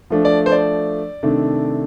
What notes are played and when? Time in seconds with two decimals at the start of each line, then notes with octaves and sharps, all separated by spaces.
0.10 F3 A3 D4
0.25 D5
0.46 C5
0.52 D5
1.23 C3 D#3 A3 D4